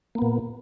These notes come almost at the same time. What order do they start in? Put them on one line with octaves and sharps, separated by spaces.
A#3 B3 A#2